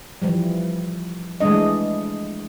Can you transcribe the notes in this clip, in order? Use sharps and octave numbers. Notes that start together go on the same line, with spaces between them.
E3 F3 G3
E3 G#3 A3 D4 D#5